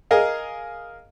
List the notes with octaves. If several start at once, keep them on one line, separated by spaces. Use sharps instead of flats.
G#4 A#4 D#5 F5